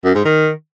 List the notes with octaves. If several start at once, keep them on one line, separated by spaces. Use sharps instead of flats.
F#2
G#2
D#3